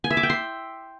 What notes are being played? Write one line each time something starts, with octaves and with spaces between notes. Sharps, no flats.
G#5
E5
D6
G5
C6